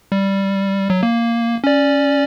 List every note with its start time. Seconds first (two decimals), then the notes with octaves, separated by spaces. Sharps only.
0.12 G3
0.90 F#3
1.03 A#3
1.64 C#4 D5